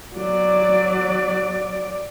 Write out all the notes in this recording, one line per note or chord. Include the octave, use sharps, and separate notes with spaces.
F#3 D5